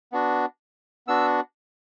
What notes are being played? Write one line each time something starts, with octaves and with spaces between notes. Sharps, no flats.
B3 D4 F#4
B3 D4 F#4 E6